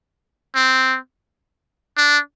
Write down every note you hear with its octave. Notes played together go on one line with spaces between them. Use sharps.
C4
D4